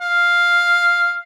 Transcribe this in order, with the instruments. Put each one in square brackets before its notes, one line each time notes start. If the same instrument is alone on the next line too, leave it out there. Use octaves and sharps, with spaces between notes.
[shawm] F5